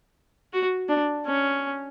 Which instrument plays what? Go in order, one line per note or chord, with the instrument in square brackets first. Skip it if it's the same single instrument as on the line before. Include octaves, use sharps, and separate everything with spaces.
[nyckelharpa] F#4
D4
C#4